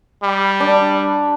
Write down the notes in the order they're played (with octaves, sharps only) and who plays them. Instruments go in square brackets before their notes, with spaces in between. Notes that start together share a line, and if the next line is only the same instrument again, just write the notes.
[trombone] G3
[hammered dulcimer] D4